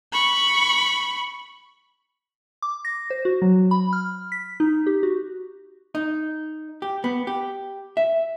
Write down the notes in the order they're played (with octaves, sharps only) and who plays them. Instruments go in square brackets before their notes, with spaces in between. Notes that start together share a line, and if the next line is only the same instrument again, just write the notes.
[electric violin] B5 C#6
[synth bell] D6
A#6
C5
F#4
F#3
B5
F6
B6
D#4
G4
F#4
[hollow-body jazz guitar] D#4
G4
B3
G4
E5